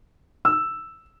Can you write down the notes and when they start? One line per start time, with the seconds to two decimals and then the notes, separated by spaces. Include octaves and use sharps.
0.45 E6